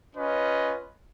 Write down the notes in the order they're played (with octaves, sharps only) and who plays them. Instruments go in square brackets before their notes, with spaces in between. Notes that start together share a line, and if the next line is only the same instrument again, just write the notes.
[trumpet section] C#4 F4 B4 D#5